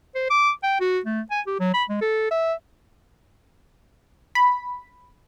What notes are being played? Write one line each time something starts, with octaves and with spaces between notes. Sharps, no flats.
C5
D6
G5
F#4
A3
G#5
G4
F#3
B5
G#3
A4
E5
B5